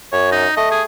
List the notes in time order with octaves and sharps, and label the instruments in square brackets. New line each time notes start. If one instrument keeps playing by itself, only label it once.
[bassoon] F#2 [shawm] C#5
[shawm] D#4
[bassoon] A3 [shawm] D#5
[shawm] G#4